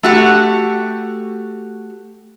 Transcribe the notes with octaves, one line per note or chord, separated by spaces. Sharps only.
A3 F#4 G4